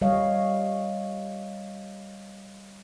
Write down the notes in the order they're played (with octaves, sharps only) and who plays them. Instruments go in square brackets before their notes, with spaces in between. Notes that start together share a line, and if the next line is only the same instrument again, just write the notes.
[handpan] G3 C#5 D#5 F5